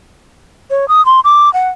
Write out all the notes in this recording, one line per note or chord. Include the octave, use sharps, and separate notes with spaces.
C#5
D#6
C6
D6
F#5